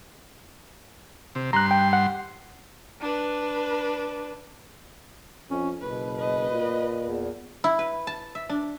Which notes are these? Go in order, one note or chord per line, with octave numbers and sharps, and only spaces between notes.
C3
G2 A#5 C6 F#6
G5
F#5
D4 B4
F2 C#4
F#1 B2 B4
B4 D#5
A#2
E2
E4
B4
A5
E5
D4